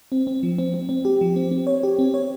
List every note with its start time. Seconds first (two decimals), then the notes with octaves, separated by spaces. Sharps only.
0.12 C4
0.27 C4
0.43 F3
0.58 C4
0.74 C4
0.89 C4
1.05 G4
1.21 F3
1.36 C4
1.51 C4
1.67 C#5
1.83 G4
1.99 C4
2.14 C#5